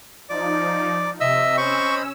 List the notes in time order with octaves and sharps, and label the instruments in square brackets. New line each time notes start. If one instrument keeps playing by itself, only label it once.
[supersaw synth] F3 D#4 [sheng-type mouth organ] D5 D6
[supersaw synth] C3 [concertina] D#5 E5 E6
[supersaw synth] C#4 E6 [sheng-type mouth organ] C5 D#5 B5 [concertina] C#6